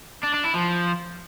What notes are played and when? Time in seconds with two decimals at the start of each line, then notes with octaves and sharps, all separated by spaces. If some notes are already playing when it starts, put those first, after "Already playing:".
0.23 D4
0.33 D4
0.44 E4
0.54 F3